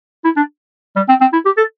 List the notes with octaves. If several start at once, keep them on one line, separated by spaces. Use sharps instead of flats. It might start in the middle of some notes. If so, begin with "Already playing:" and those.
E4
D4
G3
C4
C4
E4
G4
A4